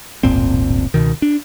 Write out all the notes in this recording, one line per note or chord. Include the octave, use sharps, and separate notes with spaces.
D1 G1 A#2 C4
C#2 B2 D#3
D4